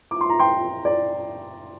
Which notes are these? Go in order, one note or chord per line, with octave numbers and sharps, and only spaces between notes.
D6
C6
A#5
G5 C6
D5